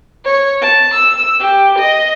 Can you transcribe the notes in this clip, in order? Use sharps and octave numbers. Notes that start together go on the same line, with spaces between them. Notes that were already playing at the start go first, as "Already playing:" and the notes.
C#5
A5
E6
G4
D#5